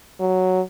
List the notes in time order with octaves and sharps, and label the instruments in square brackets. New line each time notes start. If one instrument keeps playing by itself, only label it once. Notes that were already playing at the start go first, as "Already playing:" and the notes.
[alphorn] F#3